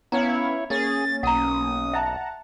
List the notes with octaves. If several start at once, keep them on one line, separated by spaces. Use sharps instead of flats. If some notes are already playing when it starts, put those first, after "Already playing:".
B3 C#4 E4 C#5 F5 A#5
A#3 C#4 G#4 A6
B1 F#5 A#5 D#6
E5 F#5 A5 A#5